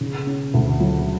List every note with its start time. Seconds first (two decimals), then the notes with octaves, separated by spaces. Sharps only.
0.01 C#3
0.27 C#4
0.54 D2
0.80 F#3